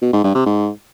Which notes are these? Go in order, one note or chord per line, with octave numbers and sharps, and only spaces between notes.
B2
G#2
G2
C3
G#2